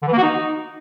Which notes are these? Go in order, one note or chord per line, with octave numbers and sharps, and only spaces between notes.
D3
E3
A#3
F#4
D#4